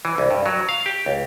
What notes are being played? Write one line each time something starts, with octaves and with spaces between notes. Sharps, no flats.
E3
C2
G2
F#3
F5
G4
C#2